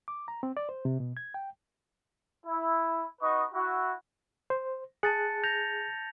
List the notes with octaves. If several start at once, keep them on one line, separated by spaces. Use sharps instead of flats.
D6
A#5
C4
D5
C5
C3
B2
G#6
G5
E4
D#4 F#4 B4 D#5 C#6
E4 F#4
C5
G#4 A5 F#6 A6 C#7
G6 A#6 F7